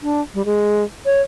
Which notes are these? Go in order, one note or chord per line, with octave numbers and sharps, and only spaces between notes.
D4
G3
G#3
C#5